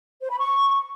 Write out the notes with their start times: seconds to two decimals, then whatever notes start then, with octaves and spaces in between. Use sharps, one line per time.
0.22 C5
0.30 B5
0.39 C#6